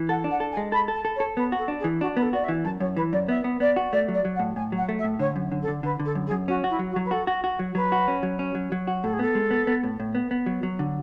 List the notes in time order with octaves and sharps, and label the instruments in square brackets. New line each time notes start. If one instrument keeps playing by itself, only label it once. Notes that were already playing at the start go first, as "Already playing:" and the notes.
Already playing: [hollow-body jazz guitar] E3
[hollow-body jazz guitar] A4 [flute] F#5
[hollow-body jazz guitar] D4
[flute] F#5
[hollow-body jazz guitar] A4
[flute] G#5
[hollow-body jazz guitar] G#3
[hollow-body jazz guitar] A4 [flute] B5
[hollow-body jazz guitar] A4
[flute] A5
[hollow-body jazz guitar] A4
[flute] C#5
[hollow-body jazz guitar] A4
[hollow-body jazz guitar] B3 [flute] B4
[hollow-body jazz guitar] F#4
[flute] A4
[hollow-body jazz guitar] D4
[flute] G#4
[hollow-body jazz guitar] E3
[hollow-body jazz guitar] D4 [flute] F#4
[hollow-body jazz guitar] B3 [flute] B4
[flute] A4
[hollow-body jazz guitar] F#4 [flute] D5
[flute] E5
[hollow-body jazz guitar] E3
[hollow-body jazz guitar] F#2 [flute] A5
[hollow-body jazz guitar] F#2 [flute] C#5
[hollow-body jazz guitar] E3 [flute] B4
[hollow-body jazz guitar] F#2 [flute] D5
[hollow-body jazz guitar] B3 [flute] E5
[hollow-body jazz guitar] B3
[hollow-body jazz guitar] B3 [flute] D5
[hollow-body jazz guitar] F#4
[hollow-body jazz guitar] A3 [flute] D5
[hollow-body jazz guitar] F#3
[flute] D5
[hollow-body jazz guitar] F#3
[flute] F#5
[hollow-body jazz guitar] A2
[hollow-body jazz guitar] A2 [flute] G#5
[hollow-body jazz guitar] F#3 [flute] F#5
[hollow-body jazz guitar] A3
[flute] E5
[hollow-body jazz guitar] A2
[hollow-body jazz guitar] D3 [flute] C#5
[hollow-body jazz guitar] F#2
D3
[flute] A4
[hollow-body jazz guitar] D3
[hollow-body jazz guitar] D3 [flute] B4
[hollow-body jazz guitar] D3
[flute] A4
[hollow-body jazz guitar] F#2
[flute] G#4
[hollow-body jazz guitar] F#2
[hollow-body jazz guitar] C#4 [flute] F#4
[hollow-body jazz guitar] F#4
[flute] E4
[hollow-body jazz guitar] F#3
[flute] F#4
[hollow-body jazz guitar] F#3
[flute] B4
[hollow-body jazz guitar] F#4 [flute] A4
[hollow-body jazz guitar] F#4
F#4
F#3
[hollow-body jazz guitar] F#3 [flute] B4
[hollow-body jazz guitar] F#4
C#4
F#3
C#4
F#3
F#3
F#4
[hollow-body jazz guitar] A2 [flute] A4
[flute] G#4
[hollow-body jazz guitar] B3 [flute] A4
[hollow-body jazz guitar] G#3
B3
B3
A2
A2
B3
B3
F#3
F#3
D3